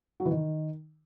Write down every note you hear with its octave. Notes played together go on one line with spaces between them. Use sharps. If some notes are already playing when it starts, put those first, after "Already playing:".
F#3
E3
D#3